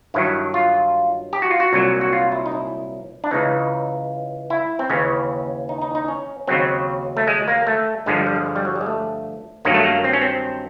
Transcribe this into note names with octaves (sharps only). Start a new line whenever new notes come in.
G2 D#3 F#3 E4
F4
G4
F#4
F4
F#4
C2 A#2 F#3
F#4
F4
E4
D#4
E4
D4
C#2 C#3 E3 D#4
E4
C4
D#2 C#3 E3 C#4
D#4
D#4
D#4
C#4
D#2 C#3 F#3 C4
A3
G#3
A#3
A3
G2 D3 F3 G#3
G3
G3
G#3
G#3
G3
F#3
G3
G#3
A3
G2 D#3 F#3 A#3
A3
A#3
C4
C#4
C4